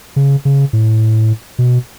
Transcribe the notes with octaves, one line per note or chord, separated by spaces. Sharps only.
C#3
C#3
A2
B2